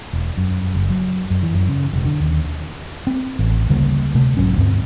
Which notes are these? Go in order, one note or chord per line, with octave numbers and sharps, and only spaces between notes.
E1
F#2
F#1
F#3
F#2
E3
F#2
C#3
E1
D3
D#2
C4
A1
D2 C#3 G3 A#3
C3 A3
B1 G#2 F#3 C#4
D2 G2 C4